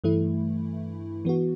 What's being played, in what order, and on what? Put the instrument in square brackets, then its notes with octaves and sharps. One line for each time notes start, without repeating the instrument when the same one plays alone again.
[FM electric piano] G2 E3 A3 E4
E3 B3 F#4